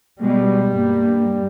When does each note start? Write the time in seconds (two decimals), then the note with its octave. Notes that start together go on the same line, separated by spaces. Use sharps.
0.22 B2 G3 G#3
0.71 G2 A#3